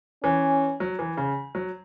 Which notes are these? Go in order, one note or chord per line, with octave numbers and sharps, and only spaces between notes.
E3 C#4
F#3
E3
C#3
F#3